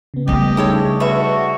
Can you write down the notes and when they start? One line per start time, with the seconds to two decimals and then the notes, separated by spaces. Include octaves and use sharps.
0.14 C#3 B3
0.28 G3 A3 G4 D#5
0.57 C#3 D#4 E4 G#4 A4 C#5
1.00 D3 F#4 B4 E5 C#6